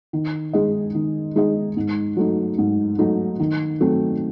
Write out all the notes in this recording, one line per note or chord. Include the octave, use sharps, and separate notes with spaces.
D#3
G#3 D#4 G#4 D#5
D#3
G#3 D#4 G#4 D#5
G#2
F#3 A3 D#4
G#2
F#3 A3 D#4
D#3
F#3 A3 C4